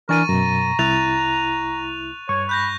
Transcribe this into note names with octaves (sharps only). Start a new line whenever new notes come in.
E3 D4 A#4 G#5 C#6 A6 D#7
F#2 B2 A#5
C2 E4 F#6 A6 F7
G2 C#5 C#6
B5 F#6 G6 A#6